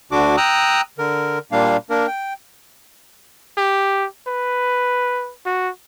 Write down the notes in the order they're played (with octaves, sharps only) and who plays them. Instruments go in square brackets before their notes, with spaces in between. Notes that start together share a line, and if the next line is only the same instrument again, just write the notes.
[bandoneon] D2 D3 D4 F#4 D6
G5 A#5 D#6 E6 F#6
D3 A#4
A#2 G3 A#3 D4 F5
A#3 D4 A#4
G5
[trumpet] G4
B4
F#4